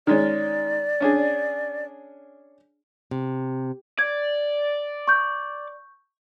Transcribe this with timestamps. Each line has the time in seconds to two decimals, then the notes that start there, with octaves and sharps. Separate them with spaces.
0.07 D#3 G#3 C#4 D5
1.00 C#4 D4 G#4
3.11 C3
3.99 D5 G#6
5.08 C#6 G6